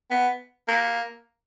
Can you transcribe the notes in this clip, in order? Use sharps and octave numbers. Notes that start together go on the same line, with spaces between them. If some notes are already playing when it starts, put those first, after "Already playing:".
B3
A#3